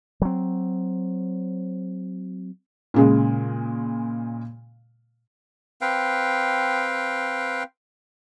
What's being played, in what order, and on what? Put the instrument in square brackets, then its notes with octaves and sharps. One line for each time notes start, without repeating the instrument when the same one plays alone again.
[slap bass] F#3 C4
[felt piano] A#2 C#3 G#3
[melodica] C4 B4 F5 G5